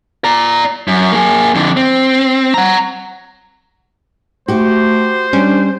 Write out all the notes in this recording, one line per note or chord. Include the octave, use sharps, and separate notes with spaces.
D5 A#5
F#2
A#3 G#4
F2 D3
C4
F#5 A#5
A3 F#4 G4 C5
G3 C#4 D4